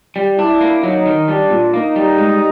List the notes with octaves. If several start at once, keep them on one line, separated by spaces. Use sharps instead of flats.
G3
D4 E4
A#3
F#3 D#4
D#3
G3 D4
A#2
A#3 D#4
G3
G#3